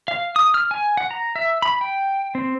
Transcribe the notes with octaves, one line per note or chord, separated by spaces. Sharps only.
F5
D#6
F6
G#5
F#5
A#5
E5
B5
G5
C4